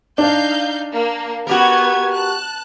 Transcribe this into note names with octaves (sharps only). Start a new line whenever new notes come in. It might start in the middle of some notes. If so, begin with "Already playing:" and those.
D4 D#4 F5 G6
A#3
B3 F#4 G4 A#4 G#6
A5 F#6